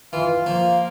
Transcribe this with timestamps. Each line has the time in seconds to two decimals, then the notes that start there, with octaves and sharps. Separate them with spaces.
0.13 E3 F4
0.46 F3 A#3